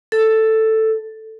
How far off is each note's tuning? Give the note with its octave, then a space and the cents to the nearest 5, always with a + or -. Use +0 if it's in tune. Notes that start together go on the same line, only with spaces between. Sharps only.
A4 +5